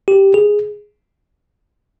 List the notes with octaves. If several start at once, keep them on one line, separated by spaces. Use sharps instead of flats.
G4
G#4